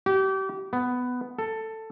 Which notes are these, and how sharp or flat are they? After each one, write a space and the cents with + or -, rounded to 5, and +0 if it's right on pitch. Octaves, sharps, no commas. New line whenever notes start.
G4 -30
B3 +10
A4 +10